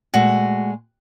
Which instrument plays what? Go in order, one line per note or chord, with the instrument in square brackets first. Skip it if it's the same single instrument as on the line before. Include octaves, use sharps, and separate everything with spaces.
[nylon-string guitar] A#2 G#3 A3 [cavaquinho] F#4